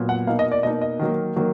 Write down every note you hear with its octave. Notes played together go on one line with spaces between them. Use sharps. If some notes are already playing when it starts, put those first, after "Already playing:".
Already playing: A#2 F#3 B3
F#5
B2 A#3 D#4 F5
D#5
D5
B2 A#3 D#4 D#5
D#5
D#3 F#3 A#3
D#3 F#3 A#3